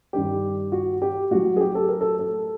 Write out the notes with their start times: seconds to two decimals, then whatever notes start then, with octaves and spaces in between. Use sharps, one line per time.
0.13 G2 D#3 G3 G4
0.72 F#4
1.02 G4
1.31 A2 F#3 F#4
1.56 G#4
1.61 G4
1.75 A4
1.88 A#4
2.01 A4
2.19 A4